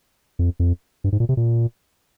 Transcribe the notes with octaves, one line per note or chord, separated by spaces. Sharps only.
F2
F2
G2
G#2
A#2
C3
A#2